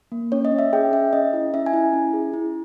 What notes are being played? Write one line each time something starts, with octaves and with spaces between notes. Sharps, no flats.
A#3
C#4 C#5
D#5
C#4
E5
G#4 G5
C#4 E5
C#4 D#5
E4
C#4 E5
G#5
E4
C#4
G#4
E4